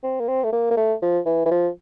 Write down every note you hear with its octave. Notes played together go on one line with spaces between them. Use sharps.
C4
A#3
C4
A3
A#3
A#3
A3
F3
E3
E3
F3